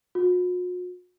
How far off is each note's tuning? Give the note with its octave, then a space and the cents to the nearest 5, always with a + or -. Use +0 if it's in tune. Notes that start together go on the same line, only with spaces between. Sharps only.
F#4 -45